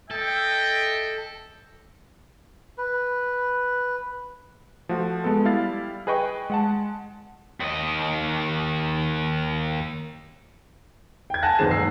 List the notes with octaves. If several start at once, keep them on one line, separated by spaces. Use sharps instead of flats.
A4 D#5 E5 G5
B4
F3 A3 F#4
G#3 B3 A4
G3 E4 F5 A6
G#4 B4 D#5 G5 C#6
G#3 F#5 A5
D#2 D#5
G5 G#6
F#5 G#5 A5 F#6 A6 A#6
G1 D#2 A#2 C4 G#4 E7
E2 G#2 E6 C7